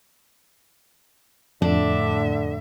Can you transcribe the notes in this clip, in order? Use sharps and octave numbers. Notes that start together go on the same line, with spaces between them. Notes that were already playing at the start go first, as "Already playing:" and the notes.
F2 A2 D3 D4 E5